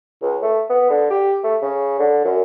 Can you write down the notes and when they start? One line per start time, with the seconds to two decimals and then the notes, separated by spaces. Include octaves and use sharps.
0.22 C#2
0.42 A3
0.70 B3
0.90 D3
1.10 G4
1.44 A3
1.62 C#3
1.99 D3
2.24 F#2